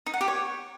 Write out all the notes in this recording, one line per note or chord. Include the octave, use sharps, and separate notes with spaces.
D#4
F#5
G4
C#5